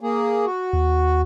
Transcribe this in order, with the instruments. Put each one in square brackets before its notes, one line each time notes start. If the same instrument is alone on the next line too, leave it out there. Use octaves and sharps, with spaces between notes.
[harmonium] A#3 G#4
F#4
[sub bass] D#2